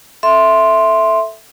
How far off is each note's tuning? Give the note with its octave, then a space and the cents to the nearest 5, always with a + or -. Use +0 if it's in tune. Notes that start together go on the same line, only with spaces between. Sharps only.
A4 +0 E5 +0 C6 +0